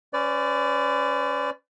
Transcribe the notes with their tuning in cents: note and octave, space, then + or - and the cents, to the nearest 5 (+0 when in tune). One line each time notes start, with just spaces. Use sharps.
C#4 +0 B4 +40 D5 -10